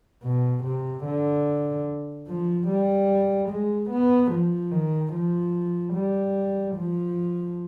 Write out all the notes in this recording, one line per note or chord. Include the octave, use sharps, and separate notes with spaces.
B2
C3
D3
F3
G3
G#3
B3
F3
D#3
F3
G3
F3